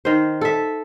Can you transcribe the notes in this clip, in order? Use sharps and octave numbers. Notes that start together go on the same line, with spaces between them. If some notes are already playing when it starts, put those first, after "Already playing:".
D#3 C5
A4 E5